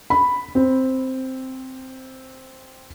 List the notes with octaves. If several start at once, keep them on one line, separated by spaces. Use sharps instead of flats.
B5
C4